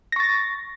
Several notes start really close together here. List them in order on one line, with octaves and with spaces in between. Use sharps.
A#6 C#6 A6